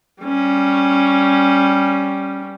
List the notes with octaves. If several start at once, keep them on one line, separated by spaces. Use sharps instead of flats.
G3 C#4